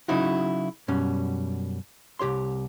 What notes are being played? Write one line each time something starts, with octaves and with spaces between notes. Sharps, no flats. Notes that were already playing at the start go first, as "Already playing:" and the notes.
C#3 F#3 D#4 E4 F#4
F#2 B2 G3 C#4
C2 G4 C#5 C6